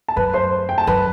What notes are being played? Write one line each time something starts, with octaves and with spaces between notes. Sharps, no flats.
A5
F#2 B4 B5
C5 C6
G5
A5
F#2 B4 B5